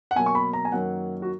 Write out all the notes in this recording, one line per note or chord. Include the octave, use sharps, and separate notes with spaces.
F#5
B2 F#3 A#3 G#5
C#6
B5
A#5
G#5
F#2 D#3 F#3 A#3 F#5
F#4